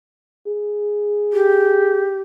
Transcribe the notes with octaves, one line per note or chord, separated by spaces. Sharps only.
G#4
G4